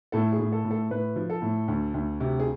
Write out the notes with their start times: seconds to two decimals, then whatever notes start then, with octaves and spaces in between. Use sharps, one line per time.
0.12 A2 A4
0.32 G#4
0.39 A2
0.52 A4
0.65 A2
0.71 A4
0.90 A2 B4
1.16 F3
1.30 A4
1.42 A2
1.68 D2
1.94 D2
2.20 C3
2.39 G#4